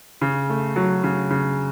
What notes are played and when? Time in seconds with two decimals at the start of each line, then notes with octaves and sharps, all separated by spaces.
0.21 C#3
0.49 A3
0.76 F#3
1.04 C#3
1.30 C#3